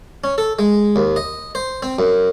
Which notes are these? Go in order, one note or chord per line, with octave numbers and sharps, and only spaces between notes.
C#4
A4
G#3
D#2
D#5
C5
C4
F#2